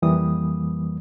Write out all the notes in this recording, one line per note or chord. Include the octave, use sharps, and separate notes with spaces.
F2 E3 G3 A#3 D#6